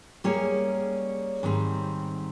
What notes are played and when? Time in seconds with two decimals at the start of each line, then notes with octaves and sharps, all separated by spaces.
0.24 G3 A#3 C#4 G#4 C#5
1.43 G#2 D#3 G3 C4